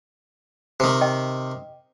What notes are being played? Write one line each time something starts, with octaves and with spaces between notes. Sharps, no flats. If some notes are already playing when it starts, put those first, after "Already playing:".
C3 D#3
D#5 G5